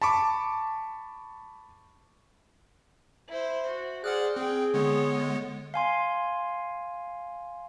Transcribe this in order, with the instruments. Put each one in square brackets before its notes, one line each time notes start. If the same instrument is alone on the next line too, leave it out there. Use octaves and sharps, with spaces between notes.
[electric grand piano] A5 B5 C#6 D6
[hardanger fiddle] E4 C5
F#4
[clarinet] G#4 [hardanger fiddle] C5 D5 [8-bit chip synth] F#5 F6 F#6
[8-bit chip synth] C4 [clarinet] G#4 [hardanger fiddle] G5
[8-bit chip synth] D3 G#3 B3 [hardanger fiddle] C#5
[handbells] F5 G#5 C6